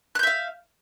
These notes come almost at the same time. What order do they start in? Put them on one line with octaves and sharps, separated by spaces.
F#6 G6 E5 F5